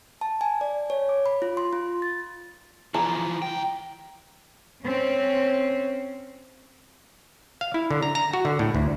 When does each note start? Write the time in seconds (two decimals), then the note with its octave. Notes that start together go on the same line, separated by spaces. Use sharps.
0.21 A5
0.41 G#5
0.61 D5
0.90 C#5
1.09 D6
1.26 B5
1.42 F4
1.57 C6
1.73 F4
2.02 A6
2.94 E3 F3 A#5
3.42 C#2 G5
4.84 C4 C#4
7.61 F5
7.74 E4
7.91 D3
8.02 A#5
8.15 A#5
8.33 F#4
8.45 D3
8.59 A2
8.75 D2